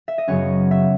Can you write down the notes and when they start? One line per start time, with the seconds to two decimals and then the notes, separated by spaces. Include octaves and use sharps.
0.08 E5
0.18 D#5
0.28 F#2 C#3 F#3 B3 C#4 C#5
0.71 E5